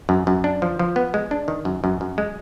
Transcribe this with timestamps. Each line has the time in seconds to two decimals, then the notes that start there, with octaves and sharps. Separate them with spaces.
0.09 F#2
0.27 F#2
0.44 D4
0.62 F3
0.79 F3
0.96 B3
1.14 G#3
1.31 D4
1.48 D#3
1.65 F#2
1.84 F#2
2.01 F#2
2.18 G#3